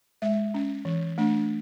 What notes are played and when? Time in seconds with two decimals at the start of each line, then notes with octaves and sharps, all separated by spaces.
0.22 G#3 E5
0.54 C#4
0.85 E3
1.18 A3 D4